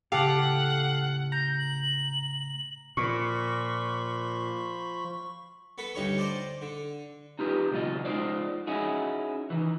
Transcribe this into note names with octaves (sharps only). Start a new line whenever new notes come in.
A2 C#3 G4 A4 F5 F#5 A5
A#5 G6
F#7
A#2 F3 C5 B5 C#6
B3 A4 B4
D2 G2 D#4 C#5 C#6
C5 D5 D#5 A5
D3
D#4 F4 G4 B4
C#2 B2 F#3 D#4 F4 D#5
G#3 B3 D#4 F4 C5 D5
C#4 D#4 E4 F#4 G#4
D#3 E3